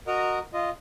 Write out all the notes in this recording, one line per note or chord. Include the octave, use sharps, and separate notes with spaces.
F#4 A#4 D#5 A#5
F4 D#5